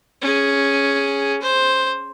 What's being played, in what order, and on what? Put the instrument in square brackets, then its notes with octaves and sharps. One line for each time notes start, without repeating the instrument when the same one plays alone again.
[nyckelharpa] C#4 G#4
C5